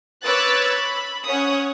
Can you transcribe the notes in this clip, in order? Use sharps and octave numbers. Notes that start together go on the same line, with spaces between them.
B4 C#5 D6 E6 F#6 A6
B5
C#4 C#5 F#5 D#6